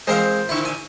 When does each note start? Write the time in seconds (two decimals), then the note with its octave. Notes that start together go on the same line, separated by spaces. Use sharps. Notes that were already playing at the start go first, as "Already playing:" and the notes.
0.07 E3 G#3 C4 A#4 C5 F5
0.49 A#2 D3 E4 C#6
0.65 G#5